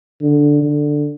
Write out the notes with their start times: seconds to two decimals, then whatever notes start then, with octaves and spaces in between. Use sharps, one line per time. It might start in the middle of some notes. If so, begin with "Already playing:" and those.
0.22 D3
0.62 D3